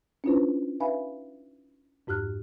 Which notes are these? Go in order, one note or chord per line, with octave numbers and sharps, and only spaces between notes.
C#4 D4 E4 F4 B4 C5
D#4 B4 E5 F5 G#5 B5
F2 G#2 G4 F6 F#6